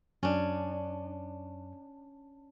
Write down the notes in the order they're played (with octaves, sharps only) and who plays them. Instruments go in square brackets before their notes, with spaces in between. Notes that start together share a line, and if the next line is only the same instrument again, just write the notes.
[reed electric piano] F#2 [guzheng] C#4 D4